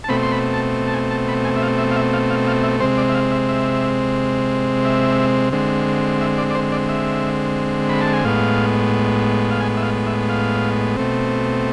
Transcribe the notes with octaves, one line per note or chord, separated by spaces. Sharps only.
A5
B2 A3 C4 B5
C6
B5
A5
A5
G#5
A5
B5
G#5
E5
F5
E5
F5
E5
F5
F5
F5
E5
C3 G#3 C4 C5
D5
E5
F5
E5
E5
E5
D3 G#3 C4
E5
D5
D5
C5
D5
E5
B5
A5
G#5
A2 G#3 B3 F5
F5
G#5
E5
F5
E5
F5
B2 A3 C4